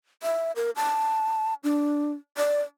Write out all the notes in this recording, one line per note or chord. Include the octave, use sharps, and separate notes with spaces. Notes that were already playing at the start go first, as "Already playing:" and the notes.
E5
A#4
A5
D4
D5